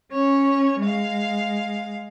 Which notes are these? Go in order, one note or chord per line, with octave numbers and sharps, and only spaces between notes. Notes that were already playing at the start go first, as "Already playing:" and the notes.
C#4 C#5
G#3 F5